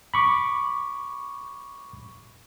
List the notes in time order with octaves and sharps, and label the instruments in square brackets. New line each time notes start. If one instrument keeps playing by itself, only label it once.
[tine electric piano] B5 C#6 D6